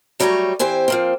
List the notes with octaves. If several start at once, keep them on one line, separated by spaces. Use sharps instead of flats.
F#3 G3 A3 C#5 G#5 A#5
E3 C4 G4 C5 G#5
F3 A#3 C4